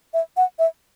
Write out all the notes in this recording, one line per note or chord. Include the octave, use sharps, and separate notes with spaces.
E5
F#5
E5